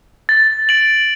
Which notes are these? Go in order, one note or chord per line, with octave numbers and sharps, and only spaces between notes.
A6
D7 F#7